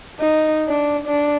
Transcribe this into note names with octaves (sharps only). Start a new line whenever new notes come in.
D#4
D4
D4